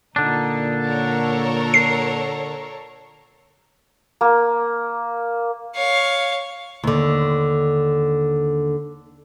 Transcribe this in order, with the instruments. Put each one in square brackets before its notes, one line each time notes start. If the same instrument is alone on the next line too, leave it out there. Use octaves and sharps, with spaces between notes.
[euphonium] A#2 [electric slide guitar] D3 D4 [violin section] D#4
[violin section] A4 A#4 C#5
[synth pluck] C7
[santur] A#3
[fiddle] C#5 F5
[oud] D#2 D3